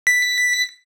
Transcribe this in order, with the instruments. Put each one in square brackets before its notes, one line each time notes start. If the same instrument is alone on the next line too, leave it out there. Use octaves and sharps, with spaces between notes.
[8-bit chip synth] B6